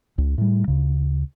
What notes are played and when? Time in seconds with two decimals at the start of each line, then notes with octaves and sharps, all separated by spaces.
0.18 C#2
0.38 A2 G3
0.68 D2 C#3